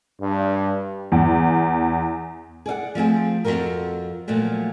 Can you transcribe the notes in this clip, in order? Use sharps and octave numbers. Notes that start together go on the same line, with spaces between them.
G2
E2
G#4 D5 F5 F#5
F3 A3 C4 G#4
F2 A#2 F4 F#4 A#4
A#2 F3 F#3 A3